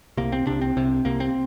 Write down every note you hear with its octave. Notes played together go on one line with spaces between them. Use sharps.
C2 C3 A#3
C4
C2 C3 D4
C4
C2 C3
C2 C3 A#3
C4